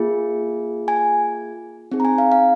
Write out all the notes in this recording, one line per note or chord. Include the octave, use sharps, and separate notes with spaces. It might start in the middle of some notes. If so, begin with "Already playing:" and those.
Already playing: A#3 F4 G#4
G#5
C4 D#4 G#4
A#5
G#5
F5
F5